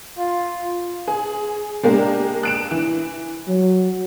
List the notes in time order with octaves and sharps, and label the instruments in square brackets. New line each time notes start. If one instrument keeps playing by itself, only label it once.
[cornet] F4
[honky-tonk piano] G#4
G#3 A#3 D4 G4
F#6 D7 E7
E3
[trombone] F#3